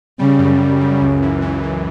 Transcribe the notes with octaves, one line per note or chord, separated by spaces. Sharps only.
C#3 G3
F#2
F#2 C#3
F#2
C#2
E3
E3
E3